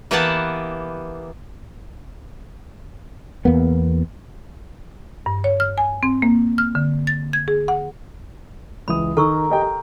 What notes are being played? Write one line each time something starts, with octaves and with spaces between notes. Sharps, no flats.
E3 A#3 B3 G4 F#5 A5
E2 A#3 B3
G2
C#5
F6
G#5
C4
A#3
F6
D3
A6
G#6
G#4
F#5
C#2 E3 B5 D#6
D#3 A4 A#4 C#6 E6
G4 D#5 G5
G5